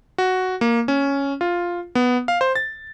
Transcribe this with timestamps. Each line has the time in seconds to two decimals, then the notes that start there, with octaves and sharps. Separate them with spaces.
0.18 F#4
0.61 A#3
0.88 C#4
1.41 F4
1.95 B3
2.28 F5
2.41 C5
2.55 A6